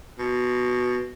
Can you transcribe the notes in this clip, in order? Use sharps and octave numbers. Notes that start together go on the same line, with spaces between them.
B2